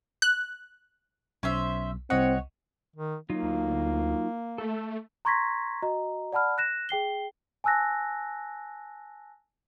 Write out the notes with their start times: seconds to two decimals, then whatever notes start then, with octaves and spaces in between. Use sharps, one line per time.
0.22 F#6
1.43 B1 C#4 C5 E5
2.10 C2 C4 C#5 D#5 F#5
2.96 D#3
3.30 F#3 A#3 D#4 F4
3.43 D2
4.58 A3 A4
5.25 A#5 C6 C#6 G#6 A#6 B6
5.82 F#4 D#5 A#5
6.33 D5 F#5 A5 B5 F6
6.58 F#6 A#6 E7
6.89 G#4 G5 C7 G7
7.64 G#5 A5 E6 F#6 A#6